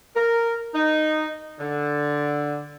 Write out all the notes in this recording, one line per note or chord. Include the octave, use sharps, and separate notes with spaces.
A#4
D#4
D3